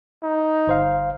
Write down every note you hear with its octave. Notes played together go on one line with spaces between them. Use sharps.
D#4
G1 C5 F5